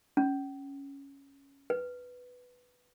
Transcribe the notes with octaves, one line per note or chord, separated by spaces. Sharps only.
C#4
B4